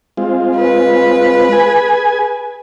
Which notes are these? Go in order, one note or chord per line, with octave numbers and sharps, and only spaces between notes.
G#3 C4 F4
B4
G#4 G#5